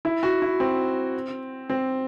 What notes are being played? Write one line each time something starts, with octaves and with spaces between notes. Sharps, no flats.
E4
F#4
E4
C4
C4